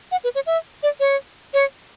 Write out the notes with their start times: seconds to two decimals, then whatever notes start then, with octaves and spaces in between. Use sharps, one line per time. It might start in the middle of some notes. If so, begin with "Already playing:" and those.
0.12 F#5
0.24 B4
0.35 C#5
0.46 E5
0.83 D5
1.00 C#5
1.54 C#5